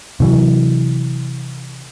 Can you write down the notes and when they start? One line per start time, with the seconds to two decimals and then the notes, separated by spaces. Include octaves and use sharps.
0.20 C3 E3 F#3